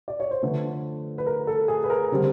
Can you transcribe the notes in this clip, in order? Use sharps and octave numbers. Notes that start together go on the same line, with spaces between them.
D5
C#5
C5
D3 F3 A3 B4
B4
A#4
A4
G#4
B4
A#4
D3 G3 C4